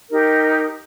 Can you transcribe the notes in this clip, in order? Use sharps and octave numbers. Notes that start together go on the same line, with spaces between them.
D#4 G4 A#4